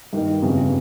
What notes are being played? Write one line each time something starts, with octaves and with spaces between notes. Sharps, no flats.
G2 D#3 A#3 D#4
G1 F2 C#3 G3